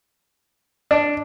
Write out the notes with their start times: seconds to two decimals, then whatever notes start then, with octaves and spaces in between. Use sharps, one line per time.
0.91 D4